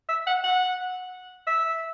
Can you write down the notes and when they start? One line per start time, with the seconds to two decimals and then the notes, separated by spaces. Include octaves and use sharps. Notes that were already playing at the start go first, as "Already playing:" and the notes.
0.09 E5
0.27 F#5
0.44 F#5
1.47 E5